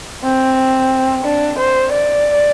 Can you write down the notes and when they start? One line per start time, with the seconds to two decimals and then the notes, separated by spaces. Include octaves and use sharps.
0.24 C4
1.24 D4
1.58 C5
1.92 D5